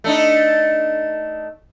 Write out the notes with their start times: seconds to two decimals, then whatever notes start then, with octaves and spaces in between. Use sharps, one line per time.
0.04 A3 D4 D#4